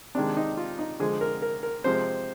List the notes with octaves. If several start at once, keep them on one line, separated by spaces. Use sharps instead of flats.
C3 D#3 G#3 D4
D#4
F4
D#4
D3 F3 G#3 G#4
A#4
A#4
A#4
C3 F3 G#3 C5